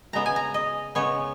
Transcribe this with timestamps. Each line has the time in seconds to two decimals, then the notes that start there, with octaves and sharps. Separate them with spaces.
0.13 C#3 G#3 B3 A#5
0.26 G#5
0.36 A#5
0.54 D#5
0.95 C#3 G#3 B3 C#5